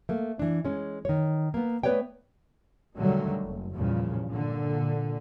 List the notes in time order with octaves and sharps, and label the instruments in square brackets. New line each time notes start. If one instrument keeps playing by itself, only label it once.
[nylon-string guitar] A3 A#3
E3 D4
G#3 C#4
D#3 C#5
A#3 B3
A3 B3 B4 C#5 D5 G5
[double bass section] B2 D3 D#3 F#3 G3 A3
F#1
E2 G2 A#2 C#3 F3
A#2 D3